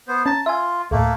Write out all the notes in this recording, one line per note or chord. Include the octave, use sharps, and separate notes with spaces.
B3 C5
C#4 A5 A#5
F4 E5 G#5
D2 A2 A3 A#3